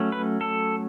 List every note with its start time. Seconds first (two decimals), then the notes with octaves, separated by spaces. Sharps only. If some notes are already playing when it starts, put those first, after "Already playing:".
Already playing: F#3 A3 C#4
0.12 B4
0.41 A4